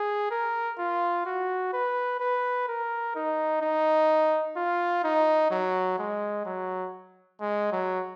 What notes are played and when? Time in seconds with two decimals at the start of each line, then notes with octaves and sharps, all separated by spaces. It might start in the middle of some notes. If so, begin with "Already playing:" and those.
Already playing: G#4
0.31 A#4
0.79 F4
1.26 F#4
1.73 B4
2.20 B4
2.68 A#4
3.15 D#4
3.62 D#4
4.57 F4
5.04 D#4
5.51 F#3
5.98 G#3
6.45 F#3
7.41 G#3
7.72 F#3